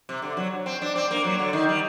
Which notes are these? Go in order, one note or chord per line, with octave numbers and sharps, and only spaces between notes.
C3
D3
F#3
C4
D4
C4
A#3
F#3
D3
D#3
G3